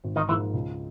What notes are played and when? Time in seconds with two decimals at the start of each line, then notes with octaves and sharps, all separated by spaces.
0.04 G#1
0.16 D#3 D#4
0.28 G#2 E3 F3 A#3 E4
0.53 C#2